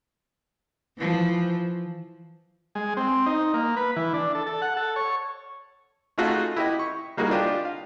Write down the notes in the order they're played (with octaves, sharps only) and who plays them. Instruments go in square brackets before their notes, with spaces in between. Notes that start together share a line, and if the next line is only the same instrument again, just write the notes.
[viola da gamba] E3 F3
[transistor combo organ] G#3
C4
D#4
A#3
B4
E3
D4
A4
A4
F#5
A4
C#5
[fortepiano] A3 D#4 F4 F#4 G#4 A4
E4 G4 D#5
C#6
G3 A#3 D#4 F#4 G#4 A#4
D4 F4 G4 D#5
F5